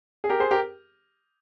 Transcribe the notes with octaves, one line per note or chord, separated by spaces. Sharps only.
G#4
G4 A#4
G#4 C5
G4 A#4